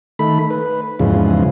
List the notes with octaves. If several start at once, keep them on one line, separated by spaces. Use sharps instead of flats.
D#3 A3 B5
B4
E2 G#2 C#3 F3